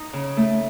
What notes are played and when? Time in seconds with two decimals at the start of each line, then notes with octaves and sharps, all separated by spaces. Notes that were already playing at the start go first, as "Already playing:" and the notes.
Already playing: D#4
0.13 C#3
0.37 A3